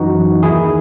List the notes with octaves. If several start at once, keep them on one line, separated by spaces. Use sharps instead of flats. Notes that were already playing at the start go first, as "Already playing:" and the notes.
Already playing: F#2 E3 D#4 F#4
D#2 D#3 E4 G#4